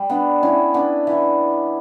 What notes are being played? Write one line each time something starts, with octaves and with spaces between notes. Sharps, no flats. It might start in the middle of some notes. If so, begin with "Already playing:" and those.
Already playing: G3
B3 D4
C#4 E4
B3 D4
E3